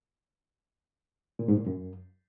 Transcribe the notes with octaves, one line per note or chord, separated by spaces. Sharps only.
A#2
G#2
A#2
F#2